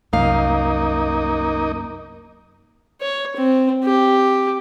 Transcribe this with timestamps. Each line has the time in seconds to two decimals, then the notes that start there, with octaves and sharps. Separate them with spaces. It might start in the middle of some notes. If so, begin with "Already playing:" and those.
0.13 C2 F#2 A#3 D#4 F5
3.01 C#5
3.37 C4
3.84 G4